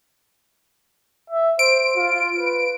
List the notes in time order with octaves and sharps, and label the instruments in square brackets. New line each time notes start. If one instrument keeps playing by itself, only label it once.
[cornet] E5
[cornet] C5 [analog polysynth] D7
[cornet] F4
B4